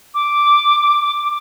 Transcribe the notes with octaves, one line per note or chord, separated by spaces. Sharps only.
D6